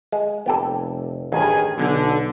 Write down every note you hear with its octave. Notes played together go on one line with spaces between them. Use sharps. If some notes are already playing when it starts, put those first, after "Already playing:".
G#3
F1 B3 G4 A4
A1 G2 D#3 G#4 G#5
B1 D3